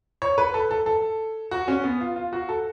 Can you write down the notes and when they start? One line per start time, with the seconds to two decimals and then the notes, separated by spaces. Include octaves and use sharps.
0.22 C#5
0.38 B4
0.54 A4
0.71 A4
0.86 A4
1.51 F#4
1.68 C#4
1.84 B3
2.01 F4
2.16 F4
2.33 F#4
2.49 A4